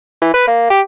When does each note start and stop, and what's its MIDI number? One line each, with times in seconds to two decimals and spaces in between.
0.22 0.31 52
0.33 0.45 71
0.47 0.68 58
0.70 0.80 67